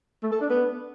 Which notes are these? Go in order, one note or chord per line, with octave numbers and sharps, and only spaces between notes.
A3
A4
D4
B3